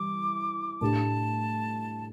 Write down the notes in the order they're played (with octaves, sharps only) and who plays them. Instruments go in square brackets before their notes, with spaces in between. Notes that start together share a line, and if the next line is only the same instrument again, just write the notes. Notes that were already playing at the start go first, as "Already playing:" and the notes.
Already playing: [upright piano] E3 G3 E4 [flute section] D6
[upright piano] A2 A3 D4 G4 [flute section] A5